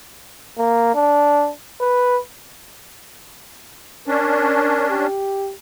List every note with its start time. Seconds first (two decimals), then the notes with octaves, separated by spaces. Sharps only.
0.58 A#3
0.95 D4
1.81 B4
4.08 C#4 D4 A#4
4.89 G4